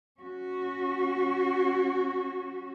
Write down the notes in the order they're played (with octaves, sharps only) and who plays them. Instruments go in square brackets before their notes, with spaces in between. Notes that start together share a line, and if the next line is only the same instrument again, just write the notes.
[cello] C#4 F#4